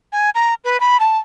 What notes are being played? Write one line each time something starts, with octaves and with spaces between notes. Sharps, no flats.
G#5
A#5
B4
B5
A5